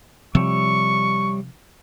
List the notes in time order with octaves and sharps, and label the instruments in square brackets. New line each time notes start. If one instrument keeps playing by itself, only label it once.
[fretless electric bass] C3 F3 C4 [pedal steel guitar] G3 C#5 E5 [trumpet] C#6